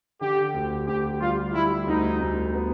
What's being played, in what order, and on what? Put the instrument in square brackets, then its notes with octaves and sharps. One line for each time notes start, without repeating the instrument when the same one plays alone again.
[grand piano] D3 [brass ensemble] G4
[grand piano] D2
[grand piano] D2 [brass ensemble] G4
[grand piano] G3 [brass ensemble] F4
[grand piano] G3 [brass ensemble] E4
[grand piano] D2 [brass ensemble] D#4
[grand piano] D2
B3